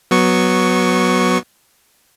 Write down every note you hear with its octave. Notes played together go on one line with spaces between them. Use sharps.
F#3 B3 C#6